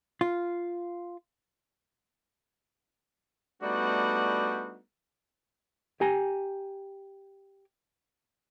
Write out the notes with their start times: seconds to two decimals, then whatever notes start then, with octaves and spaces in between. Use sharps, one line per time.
0.21 F4
3.63 G3 A3 B3 D4 D#4 F#4
6.01 G4 G#5 A#5